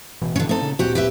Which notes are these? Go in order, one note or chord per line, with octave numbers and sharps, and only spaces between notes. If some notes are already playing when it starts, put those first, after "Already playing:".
A1 B2 E3
D3 C#4
A3 C4 D#4 A4
A#2 C#3
D1 A#2 C4 F#4 G4
G4 B4 E5